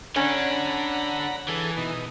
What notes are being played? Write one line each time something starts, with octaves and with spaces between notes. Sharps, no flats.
D3 C#4 D4 F#5 A#5 B5
E3 G#4 A4
B2 D#4